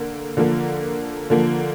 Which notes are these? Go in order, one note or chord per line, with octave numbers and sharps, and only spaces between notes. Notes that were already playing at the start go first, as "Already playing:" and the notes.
Already playing: D3 A#3
D3 F3 A#3
D3 F3 A#3